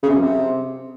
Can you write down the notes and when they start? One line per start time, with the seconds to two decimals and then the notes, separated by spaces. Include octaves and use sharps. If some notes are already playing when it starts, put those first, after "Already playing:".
0.03 C#3
0.09 C3
0.15 F#2
0.22 C3